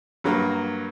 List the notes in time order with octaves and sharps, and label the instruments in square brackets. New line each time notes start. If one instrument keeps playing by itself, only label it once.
[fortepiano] G2 F#3 A#3